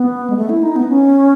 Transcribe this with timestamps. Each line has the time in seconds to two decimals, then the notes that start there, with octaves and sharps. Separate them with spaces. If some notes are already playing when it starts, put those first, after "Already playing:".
Already playing: B3
0.30 G#3
0.37 A3
0.49 E4
0.63 D#4
0.76 B3
0.89 C#4